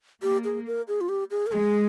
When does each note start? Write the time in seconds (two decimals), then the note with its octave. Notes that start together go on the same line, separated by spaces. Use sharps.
0.22 A#3 G4
0.44 G#4
0.67 A#4
0.88 G#4
1.01 F4
1.09 G4
1.31 G#4
1.47 A#4
1.52 G#3 G#4